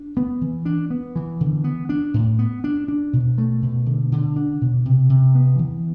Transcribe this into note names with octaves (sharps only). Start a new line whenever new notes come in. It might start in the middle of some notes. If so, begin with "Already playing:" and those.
Already playing: D4
B3
E3
D4
B3
E3
D3
B3
D4
A2
B3
D4
D4
B2
A3
B2
D3
D3
D4
B2
C3
C3
B3
E3